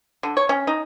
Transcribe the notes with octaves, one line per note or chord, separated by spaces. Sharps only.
D3
C#5
C#4
D#4